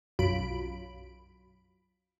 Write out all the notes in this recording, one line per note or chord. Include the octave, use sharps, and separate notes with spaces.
B1 F#2 F#3 F4 B5 D7